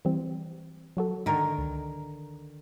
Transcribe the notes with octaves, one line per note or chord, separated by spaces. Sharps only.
E3 G3 C4
F#3 F#4 A4
G#2 D3 D#3 A#4
C#2